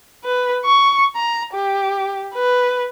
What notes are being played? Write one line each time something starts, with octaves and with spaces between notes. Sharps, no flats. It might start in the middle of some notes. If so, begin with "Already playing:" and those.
B4
C#6
A#5
G4
B4